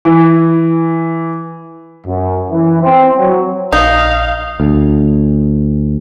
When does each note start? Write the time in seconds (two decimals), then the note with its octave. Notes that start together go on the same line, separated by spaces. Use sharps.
0.05 E3
2.06 F#2
2.51 E3
2.83 C4
3.18 F#3
3.73 A#1 D#4 F5 D#6
4.60 D2